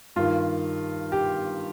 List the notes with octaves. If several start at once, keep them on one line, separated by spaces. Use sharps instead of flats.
G2 D#3 F4
G4